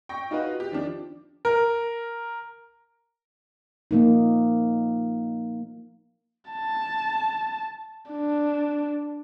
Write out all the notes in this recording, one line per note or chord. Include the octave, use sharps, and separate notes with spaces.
G5 C#6 A#6
D#4 F4 F#4 B4
G4
D#3 F3 D4
A#4
F3 A#3 D#4
A5
D4